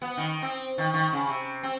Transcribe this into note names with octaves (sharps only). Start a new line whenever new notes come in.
B3
D#3
C4
D#3
D#3
C#3
C3
C4